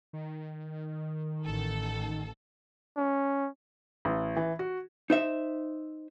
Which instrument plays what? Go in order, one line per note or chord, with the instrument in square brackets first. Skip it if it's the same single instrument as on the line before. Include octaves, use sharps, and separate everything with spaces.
[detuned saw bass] D#3
[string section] A1 A4
[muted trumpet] C#4
[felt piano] A1
E3
F#4
[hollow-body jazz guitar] D#4 C5 E5